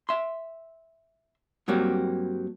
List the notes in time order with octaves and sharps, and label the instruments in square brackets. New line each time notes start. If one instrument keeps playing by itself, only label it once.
[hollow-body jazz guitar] E5 C6
G2 F#3 G3 A#3 C4